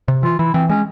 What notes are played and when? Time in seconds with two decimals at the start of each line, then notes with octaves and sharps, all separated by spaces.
0.08 C3
0.23 E3 F4
0.39 E3 E4
0.54 E3 C4
0.70 G#3 C#4